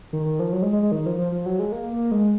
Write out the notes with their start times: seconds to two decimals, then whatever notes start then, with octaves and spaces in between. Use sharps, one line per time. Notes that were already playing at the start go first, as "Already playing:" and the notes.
0.13 D#3
0.26 D#3
0.39 F3
0.53 F#3
0.62 G#3
0.73 G#3
0.83 G#3
0.92 D#3
1.06 F3
1.18 F3
1.32 F3
1.46 F#3
1.59 G#3
1.72 A#3
1.93 A#3
2.11 G#3